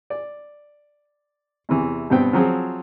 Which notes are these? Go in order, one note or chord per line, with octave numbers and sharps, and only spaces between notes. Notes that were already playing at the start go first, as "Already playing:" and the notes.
D5
E2 C3 E3
G2 B2 B3 C4 G5
F3 F#3 C4 G#4